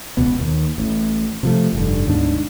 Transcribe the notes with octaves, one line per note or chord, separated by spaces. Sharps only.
E1 C#2 B2 B3
D#2
A1 A2
C3 F3 A3
F1 G2 D3
D1 B1 G#2 D4